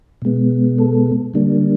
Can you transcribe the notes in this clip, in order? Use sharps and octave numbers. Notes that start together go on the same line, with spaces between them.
B2 G#3 B3
A4
D3 G3 A#3 D4